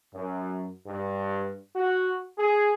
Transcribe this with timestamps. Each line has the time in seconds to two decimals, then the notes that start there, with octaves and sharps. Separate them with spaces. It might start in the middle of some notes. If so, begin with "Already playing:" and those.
0.14 F#2
0.87 G2
1.76 F#4
2.38 G#4